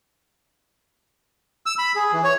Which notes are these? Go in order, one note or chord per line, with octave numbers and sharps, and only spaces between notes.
E6
B5
G#4
E3
C#5